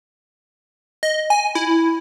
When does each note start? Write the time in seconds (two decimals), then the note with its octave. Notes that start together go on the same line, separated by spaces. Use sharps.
1.03 D#5
1.30 G#5
1.55 E4